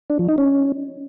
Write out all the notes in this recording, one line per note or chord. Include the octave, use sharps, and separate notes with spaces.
D4
F3
D#4
C#4